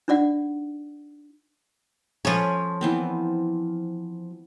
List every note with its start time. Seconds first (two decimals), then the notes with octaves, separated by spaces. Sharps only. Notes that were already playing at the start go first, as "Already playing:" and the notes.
0.08 D4 D#4 F4 D5 F#5
2.25 F3 C#4 A4 B4 C#5
2.81 E3 B3 C4